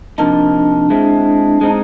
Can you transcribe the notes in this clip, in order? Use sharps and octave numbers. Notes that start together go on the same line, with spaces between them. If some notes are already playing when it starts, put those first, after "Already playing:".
C3 F3 A#3 D4 D#4
G#3 C4 E4
G#3 C4 D#4